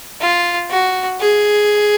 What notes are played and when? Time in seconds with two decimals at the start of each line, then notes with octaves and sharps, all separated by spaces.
0.20 F4
0.70 F#4
1.20 G#4